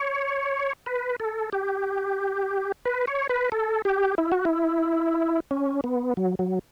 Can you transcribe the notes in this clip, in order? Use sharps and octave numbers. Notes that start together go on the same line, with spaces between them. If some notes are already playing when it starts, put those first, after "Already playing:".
Already playing: C#5
B4
A4
G4
B4
C#5
B4
A4
G4
E4
F#4
E4
C#4
B3
F#3
F#3